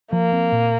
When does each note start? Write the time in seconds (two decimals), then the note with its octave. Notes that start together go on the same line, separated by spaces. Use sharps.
0.12 F3 A#3
0.32 C4
0.52 A#2